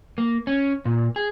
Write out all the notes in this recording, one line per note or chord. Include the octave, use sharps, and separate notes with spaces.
A#3
C#4
A#2
G#4